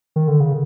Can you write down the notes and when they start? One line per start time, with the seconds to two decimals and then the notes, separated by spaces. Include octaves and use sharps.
0.16 D#3
0.28 D3
0.40 C#3